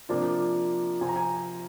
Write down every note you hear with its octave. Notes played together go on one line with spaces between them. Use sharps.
C3 F3 A#3 D4 F4
C3 F3 C4 G#5
A#5
G#5